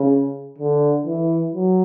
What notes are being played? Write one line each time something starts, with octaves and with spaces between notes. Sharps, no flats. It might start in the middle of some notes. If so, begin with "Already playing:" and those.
Already playing: C#3
D3
E3
F#3